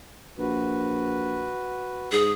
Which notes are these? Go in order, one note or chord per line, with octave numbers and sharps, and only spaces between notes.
A#1 F#4 B4
G#2 G#4